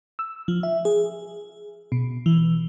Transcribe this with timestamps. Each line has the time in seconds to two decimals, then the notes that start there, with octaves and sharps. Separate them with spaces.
0.19 E6
0.48 F3
0.63 E5
0.85 G#4
1.92 B2
2.26 E3